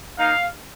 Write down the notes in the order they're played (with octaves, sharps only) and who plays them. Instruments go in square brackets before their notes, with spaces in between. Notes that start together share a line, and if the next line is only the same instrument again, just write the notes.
[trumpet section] A#3 D#4 F5